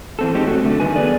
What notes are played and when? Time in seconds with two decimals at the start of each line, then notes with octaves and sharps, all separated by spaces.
0.19 E3 C4 A4
0.34 G#3 C4 C#4 D#4 G4
0.47 C3 A3 F#4 A4
0.64 F#2 D3 A3
0.80 G2 D#3 G3 D#4 B4 G#5
0.96 A3 B3 G#4 B4 D5